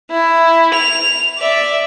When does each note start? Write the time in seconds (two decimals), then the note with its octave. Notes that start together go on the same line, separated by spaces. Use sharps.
0.10 E4
0.73 F7
1.37 D5 E5